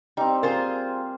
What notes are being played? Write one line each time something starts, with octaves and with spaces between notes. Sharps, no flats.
G3 C4 D#4
F4 G#4 A#4 C5